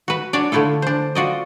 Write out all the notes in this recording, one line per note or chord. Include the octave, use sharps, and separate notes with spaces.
F#4 B4
D4 F#4 C#5 D5
D3 A3 E4 F4 A4
D4 C5
F4 F#4 D5 D#5